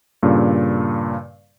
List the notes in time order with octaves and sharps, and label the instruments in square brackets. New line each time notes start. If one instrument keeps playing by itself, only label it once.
[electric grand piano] G2 A#2 C#3